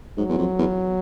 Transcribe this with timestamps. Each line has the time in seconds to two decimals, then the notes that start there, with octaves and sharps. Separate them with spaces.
0.17 G#2 F#3
0.29 E2
0.38 F2
0.59 E2